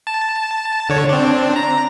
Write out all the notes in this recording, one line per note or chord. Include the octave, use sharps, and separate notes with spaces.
A5
D3 C#5
C4 D4
A#5